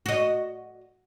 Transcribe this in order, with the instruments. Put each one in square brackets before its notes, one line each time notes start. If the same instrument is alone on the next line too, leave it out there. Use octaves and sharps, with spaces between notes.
[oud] F#4 D#5